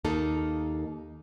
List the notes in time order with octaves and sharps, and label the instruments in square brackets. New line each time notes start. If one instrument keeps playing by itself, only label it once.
[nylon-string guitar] D#2 A#3 D#4 A4